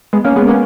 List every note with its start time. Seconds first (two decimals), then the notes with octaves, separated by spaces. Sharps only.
0.13 G#3 B3
0.25 A#3 C#4
0.36 G#3 B3
0.48 A#3 C#4